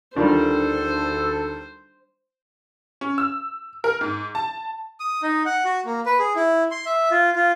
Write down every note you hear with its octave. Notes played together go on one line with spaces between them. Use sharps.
D2 D#3 G3 D4 F4 A4 C5
C#4
E6
A#4
G#2
A5
D#6
D#4
F#5
F#4
A#3
B4
G#4
E4
C6
E5
F4
F4